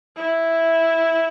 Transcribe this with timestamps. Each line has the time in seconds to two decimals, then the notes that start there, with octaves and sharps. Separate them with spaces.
0.16 E4